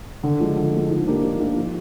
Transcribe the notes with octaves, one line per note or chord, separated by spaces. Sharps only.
D3
F3 G#3
D3
F3 G#3
G#2
F3 A#3 D4 G4
G#2
F3 A#3 D4 G4
F3